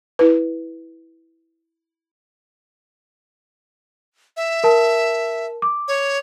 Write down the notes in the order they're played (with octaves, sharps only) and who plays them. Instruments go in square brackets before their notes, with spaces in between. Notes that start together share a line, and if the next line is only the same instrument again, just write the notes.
[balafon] E4 B4
[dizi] E5
[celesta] A#4 A5
D6
[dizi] C#5